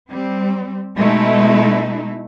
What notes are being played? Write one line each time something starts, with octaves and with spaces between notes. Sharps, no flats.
G3 C4
B2 G#3 A3 D#4 E4